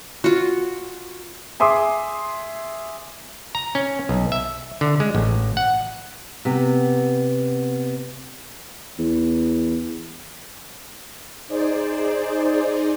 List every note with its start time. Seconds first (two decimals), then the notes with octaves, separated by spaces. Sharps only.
0.24 F4 F#4
1.60 G#4 E5 C6 D6 D#6
3.55 A#5
3.75 C#4
4.09 B1
4.32 E5
4.81 D3
5.00 G#3
5.15 A1
5.57 F#5
6.45 C3 B3
8.99 E2
11.48 D#4 G#4 C5 D5